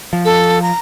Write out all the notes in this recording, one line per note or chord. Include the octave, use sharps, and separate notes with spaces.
F3
A4
A#5